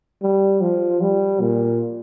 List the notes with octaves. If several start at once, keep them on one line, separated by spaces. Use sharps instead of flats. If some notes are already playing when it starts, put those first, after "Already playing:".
G3
F3
G3
A#2